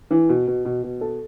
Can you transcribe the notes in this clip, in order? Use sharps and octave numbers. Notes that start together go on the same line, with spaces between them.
E3
B2
B2
B2
B2
A4